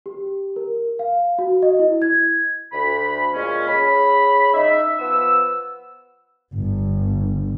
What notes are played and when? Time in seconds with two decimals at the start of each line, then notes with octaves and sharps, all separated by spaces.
0.06 G4
0.56 A#4
0.99 F5
1.39 F#4
1.62 D#5
1.79 E4
2.02 G#6
2.72 D2 B5
3.34 A#2 G#3 C#4
3.67 C#3 B5
4.54 D#4 E5
4.98 F3 B3 E6
6.55 G1